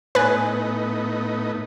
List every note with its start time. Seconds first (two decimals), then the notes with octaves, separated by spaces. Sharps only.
0.15 A2 B3 D#4 B4 G#5